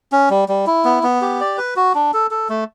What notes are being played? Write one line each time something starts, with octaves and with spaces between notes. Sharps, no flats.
C#4
G3
G3
E4
B3
B3
G4
D5
B4
F#4
D4
A4
A4
A3